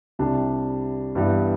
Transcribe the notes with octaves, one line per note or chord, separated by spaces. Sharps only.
C2 C3 G3 D4
G2 E3 G3 B3